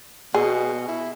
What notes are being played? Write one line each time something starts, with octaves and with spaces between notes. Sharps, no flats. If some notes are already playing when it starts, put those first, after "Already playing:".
B2 G#4
E4